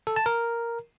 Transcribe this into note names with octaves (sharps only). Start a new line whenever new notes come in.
A4
A5
A#4